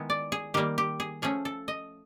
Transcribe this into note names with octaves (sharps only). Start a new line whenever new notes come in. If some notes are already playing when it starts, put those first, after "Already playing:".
Already playing: D#3 G#3 B3 E4
D5
G#4
D#3 G3 A#3 G4
G4
G#4
F3 A3 C#4 G#4
A4
D#5